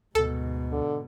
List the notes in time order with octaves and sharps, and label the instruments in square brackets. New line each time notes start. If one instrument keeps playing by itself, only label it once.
[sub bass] D2 [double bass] G#2 B2 [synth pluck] A4
[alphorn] D3